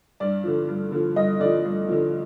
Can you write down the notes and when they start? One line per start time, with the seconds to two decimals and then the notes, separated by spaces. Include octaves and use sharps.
0.20 G2 D5
0.44 D3 F3
0.68 G2
0.92 D3 F3
1.16 G2 D#5
1.40 D3 F3 D5
1.65 G2
1.89 D3 F3